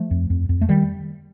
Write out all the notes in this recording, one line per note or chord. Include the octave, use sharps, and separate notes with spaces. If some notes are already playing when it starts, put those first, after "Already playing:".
Already playing: F3 A3
F2
F2
F2
A3
D#3 G3